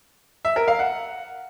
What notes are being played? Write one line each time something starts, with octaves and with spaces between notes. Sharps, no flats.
E5
A#4
F5
F#5